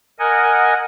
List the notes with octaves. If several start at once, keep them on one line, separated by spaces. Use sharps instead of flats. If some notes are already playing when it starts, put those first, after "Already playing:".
A#4 D#5 F#5 G#5